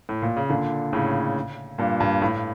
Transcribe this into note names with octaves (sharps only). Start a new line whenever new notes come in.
A2
A#2
C#3
A#2 D3
A2 C#3
G2 A#2
G2
A2